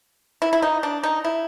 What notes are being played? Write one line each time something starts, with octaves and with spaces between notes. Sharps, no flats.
E4
E4
D#4
D4
D#4
E4